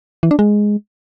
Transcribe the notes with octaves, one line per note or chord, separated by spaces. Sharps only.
E3
D4
G#3